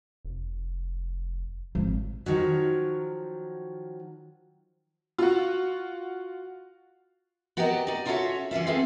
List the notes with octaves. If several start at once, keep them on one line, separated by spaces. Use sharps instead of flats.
F1
G#1 F3
D#3 F3 F#3
F4 F#4
B3 F#4 G4 A#4 D5 D#5
D#4 D5
C#4 F4 F#4 A4 C#5 E5
E3 C#4 F4 E5
B3 C4 F4 G#4 A4